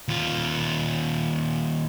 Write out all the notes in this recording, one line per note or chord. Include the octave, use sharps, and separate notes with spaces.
D#2 F4